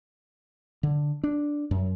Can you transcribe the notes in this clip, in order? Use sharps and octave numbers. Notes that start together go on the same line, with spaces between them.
D3
D4
F#2